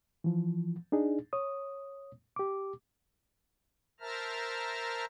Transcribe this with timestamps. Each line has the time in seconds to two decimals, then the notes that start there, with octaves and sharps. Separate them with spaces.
0.24 E3 F3
0.92 D4 D#4 G#4
1.33 C#5 D#6
2.36 G4 D6
4.00 A#4 C5 E5 A5 A#5 F6